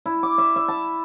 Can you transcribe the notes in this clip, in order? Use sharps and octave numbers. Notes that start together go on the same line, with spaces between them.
E4
D6
E5
E5
A5